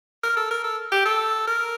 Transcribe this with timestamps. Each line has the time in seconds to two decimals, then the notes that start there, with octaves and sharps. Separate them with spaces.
0.24 A#4
0.37 A4
0.51 A#4
0.64 A4
0.92 G4
1.05 A4
1.48 A#4